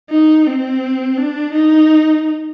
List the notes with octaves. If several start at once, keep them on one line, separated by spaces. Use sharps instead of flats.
D#4
C4
D4
D#4